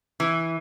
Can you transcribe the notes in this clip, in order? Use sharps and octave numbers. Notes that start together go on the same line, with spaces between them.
E3